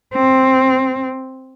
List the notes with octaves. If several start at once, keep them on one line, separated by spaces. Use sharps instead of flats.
C4